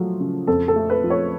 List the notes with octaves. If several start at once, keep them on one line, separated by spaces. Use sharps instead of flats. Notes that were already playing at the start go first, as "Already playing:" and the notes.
Already playing: F3 F#3 A3
C#3
F2 A4
A4
A3
B4
F3
C#5